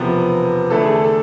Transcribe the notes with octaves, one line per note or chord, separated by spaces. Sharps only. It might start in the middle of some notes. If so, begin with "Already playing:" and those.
Already playing: E1 E2 C3 F3 B3 B4
E2 D3 A3 E4 A4
G#4
A4
A4